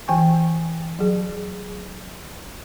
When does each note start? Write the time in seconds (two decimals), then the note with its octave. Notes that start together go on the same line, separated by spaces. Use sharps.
0.08 E3 G5 G#5 C#6
0.99 F#3 G#4